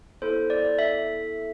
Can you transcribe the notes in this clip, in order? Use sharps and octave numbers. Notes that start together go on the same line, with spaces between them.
B3 E4 A4 C5
D5
E5